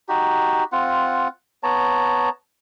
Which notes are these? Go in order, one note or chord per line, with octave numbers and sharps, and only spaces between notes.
D#4 F#4 G4
C4 F4 F#5
B3 C#5 A5 A#5